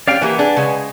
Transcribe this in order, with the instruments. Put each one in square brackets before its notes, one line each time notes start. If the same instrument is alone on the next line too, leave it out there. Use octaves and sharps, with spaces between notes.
[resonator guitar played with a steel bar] C#4 G4 [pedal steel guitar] D5 F5 G5
[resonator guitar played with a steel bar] E3 A#3 G4 [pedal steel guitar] B4 F#5 G#5
[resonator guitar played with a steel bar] D4 G#4
C#3 G#3